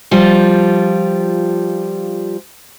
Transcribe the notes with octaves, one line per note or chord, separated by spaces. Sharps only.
F3 G3 F4